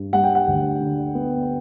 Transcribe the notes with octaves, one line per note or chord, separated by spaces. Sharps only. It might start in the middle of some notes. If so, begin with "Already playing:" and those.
Already playing: G2
G3 F#5
G5
F#5
D2
D3
B3